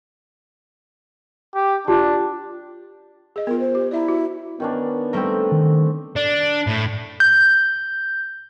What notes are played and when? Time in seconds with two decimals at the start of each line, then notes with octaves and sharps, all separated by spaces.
1.55 G4
1.87 D4 F4 G4 A5
3.36 G#4 D#5
3.47 B3 F4 A#4
3.60 C5
3.75 G4
3.91 E4 D5 E5 A#5
4.08 F#4
4.60 D#3 B3 C#4 D4
5.13 G3 A3 C4 A4 A#4
5.52 D#3
6.16 D4
6.67 A2
7.20 G6